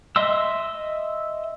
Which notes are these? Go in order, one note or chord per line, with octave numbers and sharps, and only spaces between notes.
D#5 E5 C6 E6